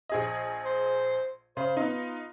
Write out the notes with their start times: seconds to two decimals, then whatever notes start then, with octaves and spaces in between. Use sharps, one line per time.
0.09 A#1 G#4 D#5
0.65 C5
1.57 C#3 C5
1.77 B3 D#4 F4